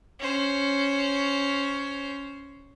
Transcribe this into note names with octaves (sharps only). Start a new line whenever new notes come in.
C#4 C5